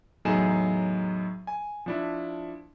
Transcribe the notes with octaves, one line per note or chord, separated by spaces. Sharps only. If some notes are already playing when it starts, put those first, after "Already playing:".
E2 A2 F#3 D#4 G#4 E7
G#5
F3 D4 E4